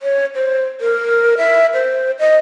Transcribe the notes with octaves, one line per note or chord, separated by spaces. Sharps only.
C#5
C5
A#4
E5
C5
D#5